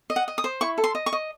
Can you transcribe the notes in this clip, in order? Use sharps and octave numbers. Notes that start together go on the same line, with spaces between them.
D#5
F#5
D#5
D#6
C5
E4 C#6
A4
C6
D#5
C#6
D#5